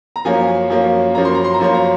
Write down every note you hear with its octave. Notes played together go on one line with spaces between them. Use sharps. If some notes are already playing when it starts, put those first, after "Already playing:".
A#5
F#2 F3 A#3 C#4 G#5
F#2 F3 A#3 C#4
F#2 F3 A#3 C#4 A#5
C6
A#5
C6
A#5
F#2 F3 A#3 C#4 C6
A#5